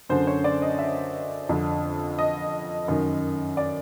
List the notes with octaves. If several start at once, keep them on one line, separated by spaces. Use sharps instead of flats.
F#2 D3 C5
C#5
D5
D#5
E5
F2 D3
D#5
F#2 D#3
D5